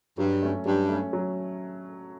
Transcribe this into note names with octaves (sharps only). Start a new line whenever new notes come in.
G2 F#3
A3 C#4
G2 F#3
A3 C#4
F#3